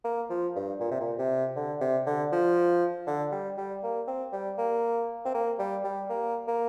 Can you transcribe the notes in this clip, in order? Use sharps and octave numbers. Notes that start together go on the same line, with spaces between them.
A#3
F3
G2
A#2
C3
A#2
C3
D3
C3
D3
F3
D3
G3
G3
A#3
C4
G3
A#3
C4
A#3
G3
G3
A#3
A#3